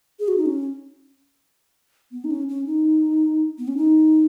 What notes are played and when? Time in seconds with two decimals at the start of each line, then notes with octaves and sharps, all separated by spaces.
0.20 G#4
0.28 F#4
0.37 D#4
0.46 C#4
2.12 B3
2.24 D#4
2.31 C#4
2.49 C#4
2.66 D#4
3.58 B3
3.68 C#4
3.77 D#4